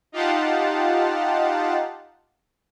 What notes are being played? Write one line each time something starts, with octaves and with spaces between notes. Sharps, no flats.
D#4 F4 G4 F5 F#5 A5